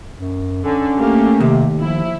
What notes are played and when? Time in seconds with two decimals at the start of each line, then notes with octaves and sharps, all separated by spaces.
0.17 F#2
0.65 D3 C#4
0.98 A3 A#3 G4
1.40 D#2 C3
1.78 F3 E4